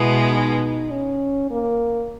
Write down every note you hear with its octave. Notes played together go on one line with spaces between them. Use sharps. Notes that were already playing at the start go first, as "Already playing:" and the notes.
Already playing: B2 G#3 B3 E4
D#4
C#4
A#3